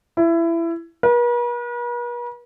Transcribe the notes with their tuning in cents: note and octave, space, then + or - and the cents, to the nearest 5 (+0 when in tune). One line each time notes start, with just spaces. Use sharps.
E4 +20
B4 -45